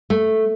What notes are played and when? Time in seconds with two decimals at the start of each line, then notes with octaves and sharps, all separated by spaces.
0.10 A3